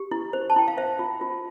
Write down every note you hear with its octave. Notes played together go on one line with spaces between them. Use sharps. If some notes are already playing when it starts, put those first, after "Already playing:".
Already playing: G4
E4
C5
A5
E4 G5
F5
C5 E5
F4
F4